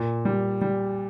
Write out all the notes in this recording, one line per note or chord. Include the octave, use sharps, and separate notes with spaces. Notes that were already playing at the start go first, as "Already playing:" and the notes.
Already playing: A#2
G3
G3